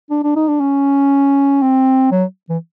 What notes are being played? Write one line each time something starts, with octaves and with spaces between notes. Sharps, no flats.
D4
D4
D#4
D4
C#4
C4
F#3
E3